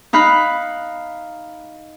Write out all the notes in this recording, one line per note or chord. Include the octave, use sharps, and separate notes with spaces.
D#4 F5 B5 F#6